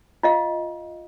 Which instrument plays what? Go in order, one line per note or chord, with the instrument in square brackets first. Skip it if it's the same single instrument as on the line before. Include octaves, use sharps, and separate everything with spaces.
[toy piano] F4 D#5 F5